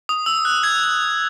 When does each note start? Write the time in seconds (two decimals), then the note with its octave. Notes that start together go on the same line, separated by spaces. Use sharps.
0.09 D#6
0.26 E6
0.45 F#6
0.63 G#6